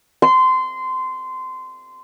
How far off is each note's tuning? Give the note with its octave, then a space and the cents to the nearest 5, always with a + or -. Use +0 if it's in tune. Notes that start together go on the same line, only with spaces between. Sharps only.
C6 -20